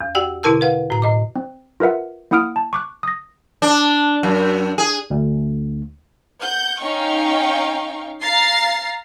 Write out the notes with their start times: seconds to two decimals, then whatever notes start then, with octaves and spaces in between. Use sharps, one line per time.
0.01 E2
0.15 F#4 G4 D5 F#5 G5
0.43 B2 D3 E4 A#4 A5 E6
0.61 B4 F5 F#5
0.90 A2 A#5
1.02 A2 D#5 D6
1.36 C4
1.80 F4 A#4 B4 E5 F#5
2.31 A#3 E4 F#5 D#6 F6 D7
2.56 A5
2.73 C#6 D6 F#6
3.03 D#6 A#6
3.62 D4
4.23 F#2
4.78 G#4
5.10 D2
6.41 F#5 G6
6.80 C#4 D#4 F5 G5 C#6
8.20 F5 A#5 A6 C7